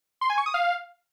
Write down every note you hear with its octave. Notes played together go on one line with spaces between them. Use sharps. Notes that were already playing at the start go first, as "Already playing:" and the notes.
C6
G#5
C#6
D#6
F5